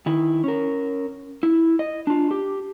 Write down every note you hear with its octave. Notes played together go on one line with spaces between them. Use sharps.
D#3 E4
C#4 A#4
E4
D#5
D4 F4
G4